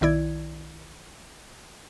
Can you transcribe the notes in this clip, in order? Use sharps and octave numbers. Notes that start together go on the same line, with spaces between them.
B1 D#3 E4 D5 G#6